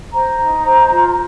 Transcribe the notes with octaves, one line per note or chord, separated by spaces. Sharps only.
C5 A#5
D#4
C5
F4